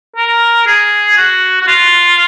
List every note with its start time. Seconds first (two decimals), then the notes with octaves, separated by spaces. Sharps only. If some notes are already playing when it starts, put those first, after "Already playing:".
0.16 A#4
0.66 G#4
1.17 F#4
1.61 F#4
1.67 F4